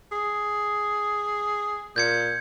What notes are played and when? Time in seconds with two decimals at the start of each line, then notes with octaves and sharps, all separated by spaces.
0.12 G#4
1.96 A#2 G6 G#6 C#7